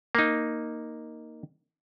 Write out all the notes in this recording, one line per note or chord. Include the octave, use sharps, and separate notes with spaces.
A#3 D#4